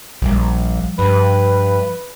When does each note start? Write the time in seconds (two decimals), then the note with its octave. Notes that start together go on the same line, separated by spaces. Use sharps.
0.22 A#1 F3 G3
0.99 G2 B4